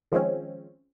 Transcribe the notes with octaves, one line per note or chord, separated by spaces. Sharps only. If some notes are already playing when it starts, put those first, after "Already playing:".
D#3 F3 G#3 C4 C#4